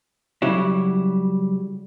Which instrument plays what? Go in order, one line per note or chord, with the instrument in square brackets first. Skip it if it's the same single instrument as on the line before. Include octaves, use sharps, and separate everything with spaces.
[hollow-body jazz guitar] C#3 F#3 G3 E4